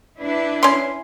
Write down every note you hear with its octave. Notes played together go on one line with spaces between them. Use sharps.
D4 E4 B4
C#4 C6